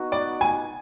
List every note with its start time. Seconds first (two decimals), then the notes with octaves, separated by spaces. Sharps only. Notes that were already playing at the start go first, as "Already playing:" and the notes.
Already playing: B3 D#4 F#4
0.12 D5
0.41 G#5